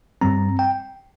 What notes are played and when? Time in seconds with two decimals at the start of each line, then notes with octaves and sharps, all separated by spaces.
0.21 G2 G3 C4 A#5
0.59 G5